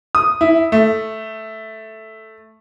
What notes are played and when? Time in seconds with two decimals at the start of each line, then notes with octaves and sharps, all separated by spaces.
0.15 D#6
0.41 E4
0.72 A3